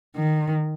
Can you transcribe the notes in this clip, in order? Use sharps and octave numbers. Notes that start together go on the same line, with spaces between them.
D#3